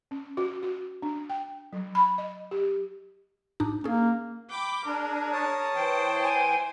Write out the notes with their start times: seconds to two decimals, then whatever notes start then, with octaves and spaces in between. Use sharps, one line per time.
0.11 C#4
0.37 F#4
0.63 F#4
1.02 D4
1.30 G5
1.73 F#3
1.95 B5
2.18 D#5
2.51 G4
3.60 A2 D4 D#4
3.84 A#3 C#4 G#4
4.50 G5 B5 D6
4.85 D4 G#4 A#4
5.33 C#5 A5 D#6
5.76 E3 C5 G5
6.24 G#5